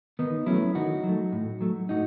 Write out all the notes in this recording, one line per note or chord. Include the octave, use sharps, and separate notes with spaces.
D#3 B3 D#4
F#3 A3 C#4 E4
D#3 D#4 F#4
F#3
A3
A2
F#3 A3
A2 D#4 F#4